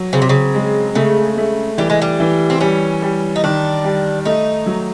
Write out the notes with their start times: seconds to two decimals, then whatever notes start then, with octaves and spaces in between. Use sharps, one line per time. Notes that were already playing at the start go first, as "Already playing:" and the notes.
Already playing: F#3
0.13 C#3 C4
0.22 C3
0.29 C#3
0.54 G#3
0.95 C#3 A3
1.38 A3
1.78 E3 G3
1.90 G#3
2.02 G3
2.20 E3
2.50 C4
2.61 G3 C#4
3.02 G3
3.36 D#4
3.43 D#3 D4
3.84 G3
4.25 A3 D#4
4.66 F#3